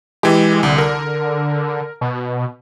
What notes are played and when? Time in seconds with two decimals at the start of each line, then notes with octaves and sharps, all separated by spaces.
0.23 E3 G#3 G4
0.63 C2 D3
0.78 A#4
2.01 B2